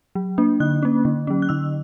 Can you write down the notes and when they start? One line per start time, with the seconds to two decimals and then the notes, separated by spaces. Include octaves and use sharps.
0.15 F#3
0.38 A#3 D4
0.60 D3 F#6
0.83 A#3 C#4
1.05 D3
1.27 F#3 C#4
1.42 F#6
1.49 D3 E6